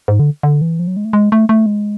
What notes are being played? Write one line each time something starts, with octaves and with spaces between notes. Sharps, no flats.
G#2
D3
D3
E3
F3
F#3
G#3
A3
G#3
A3
A3
G#3